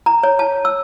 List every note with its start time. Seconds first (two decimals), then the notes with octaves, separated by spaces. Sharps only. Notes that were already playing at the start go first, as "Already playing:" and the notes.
0.06 A#5
0.23 C#5
0.39 A5
0.65 E6